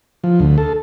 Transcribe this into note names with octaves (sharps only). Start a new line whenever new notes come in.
F3
D2
A4